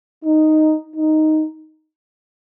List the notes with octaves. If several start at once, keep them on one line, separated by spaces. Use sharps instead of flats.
D#4
D#4